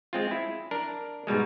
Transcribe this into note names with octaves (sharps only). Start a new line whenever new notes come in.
G#3 C4 F4
E4
D4 A#4
G#2 B2 G3 G#3